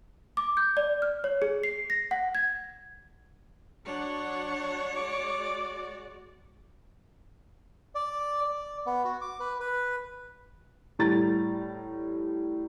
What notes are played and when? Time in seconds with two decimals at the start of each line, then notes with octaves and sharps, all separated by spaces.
0.37 D6
0.57 G6
0.77 D5
1.02 F6
1.24 C#5
1.42 G#4
1.63 C7
1.90 A#6
2.11 F#5
2.35 G#6
3.85 F#3 D4 C#5 F#5
4.96 G#3 F#4 D5 D6
7.95 D5
8.45 D5
8.86 B3
9.05 F#4
9.21 D6
9.40 B4
9.60 B4
10.99 A2 G3 A#5 A6